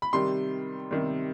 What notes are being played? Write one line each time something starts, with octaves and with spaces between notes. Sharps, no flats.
B5
C3 D#3 G3 C6
C3 D#3 G3